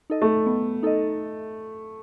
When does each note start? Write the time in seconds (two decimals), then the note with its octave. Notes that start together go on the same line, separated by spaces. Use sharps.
0.10 D#4 A4 D#5
0.22 A3
0.46 B3
0.83 D#4 A4 D#5